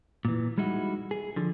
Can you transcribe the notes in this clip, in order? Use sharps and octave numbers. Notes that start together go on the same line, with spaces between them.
A#2 E3
G3 G#3 D#4 E4 F#4
G#4
D3 F3